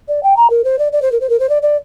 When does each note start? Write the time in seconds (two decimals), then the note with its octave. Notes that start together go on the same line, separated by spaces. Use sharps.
0.08 D5
0.23 G5
0.36 A#5
0.50 A#4
0.64 C5
0.79 D5
0.92 D5
1.02 C5
1.12 A#4
1.20 C5
1.29 A#4
1.40 C5
1.49 D5
1.62 D5